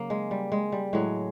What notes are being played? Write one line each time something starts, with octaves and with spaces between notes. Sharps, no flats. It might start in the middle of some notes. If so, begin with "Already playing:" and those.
Already playing: C#3 F#3 A#3
G#3
G3
G#3
G3
A2 F#3 G#3